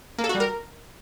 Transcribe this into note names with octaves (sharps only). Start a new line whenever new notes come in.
A#3
A4
F#4
G3
A#4